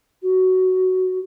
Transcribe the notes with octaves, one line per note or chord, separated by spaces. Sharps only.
F#4